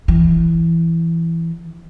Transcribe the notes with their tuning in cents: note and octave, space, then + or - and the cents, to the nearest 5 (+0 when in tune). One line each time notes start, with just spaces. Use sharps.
E3 +10